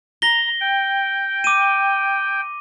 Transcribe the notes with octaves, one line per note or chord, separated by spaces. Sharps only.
A#5 A#6 G7
G5
D6 D#7